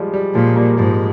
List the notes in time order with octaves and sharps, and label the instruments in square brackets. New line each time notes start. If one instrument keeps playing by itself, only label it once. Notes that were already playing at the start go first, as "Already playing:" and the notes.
Already playing: [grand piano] F3 G3 G#3
G3
[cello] A#2 [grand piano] F3 G#3
[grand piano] G3 A#3
[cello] G#2 [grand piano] F3 G#3